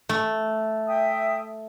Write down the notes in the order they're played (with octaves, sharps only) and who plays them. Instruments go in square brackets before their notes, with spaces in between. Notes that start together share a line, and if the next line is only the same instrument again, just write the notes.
[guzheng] A3
[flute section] E5 G5 D#6